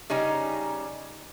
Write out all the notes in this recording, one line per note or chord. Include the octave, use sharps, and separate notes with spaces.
C#3 G3 C#4 D#4